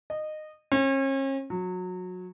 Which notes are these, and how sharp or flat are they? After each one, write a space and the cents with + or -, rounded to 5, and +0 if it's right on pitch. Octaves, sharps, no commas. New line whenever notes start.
D#5 -20
C#4 -40
F#3 -25